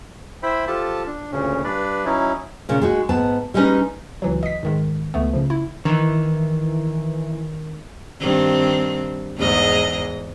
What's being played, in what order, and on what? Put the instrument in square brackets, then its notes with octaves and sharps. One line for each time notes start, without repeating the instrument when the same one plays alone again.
[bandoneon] E4 C5 E5 G5 B5
F3 F4 G4 A4 A5
D4
D2 A#2 C#3 C#4
G2 D4 B4 D5
F#3 C#4 D#4 E4
[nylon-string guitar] A#2 C#3
G#3 D#4 F#4
G#2 B3 A5
G3 G#3 C#4 D#4 B4
[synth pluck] C#2 E3 F#3
D#5 B6
G#2 D#3 G#3
C#2 A3 B3
C#3 F3
E4
[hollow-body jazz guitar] D#3 [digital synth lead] E3
[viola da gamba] G2 D#3 C4
E2 G#2 D#5